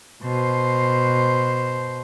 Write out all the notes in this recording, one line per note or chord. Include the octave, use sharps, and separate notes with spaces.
B2 C5